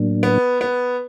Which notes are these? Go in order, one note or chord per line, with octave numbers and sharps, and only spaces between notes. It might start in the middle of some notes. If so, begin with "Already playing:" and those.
Already playing: A2 F#3 A#3 D4
B3
B3